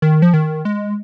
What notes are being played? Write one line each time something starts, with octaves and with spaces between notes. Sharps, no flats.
D#3
F3
D#3
G#3